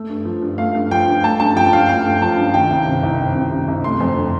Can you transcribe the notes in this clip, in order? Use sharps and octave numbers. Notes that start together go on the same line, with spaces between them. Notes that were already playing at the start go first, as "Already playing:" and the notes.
Already playing: A3
G2
F3
G2
A3 F5
G2
F3 G5
G2
A3 A5
G2 A5
F3 G5
G2 F5
A3 G5
G2
F3 A5
G2
D#3 G5
C2
C3
C2
D#3
C2
C3
C2
A3 C6
F2
D3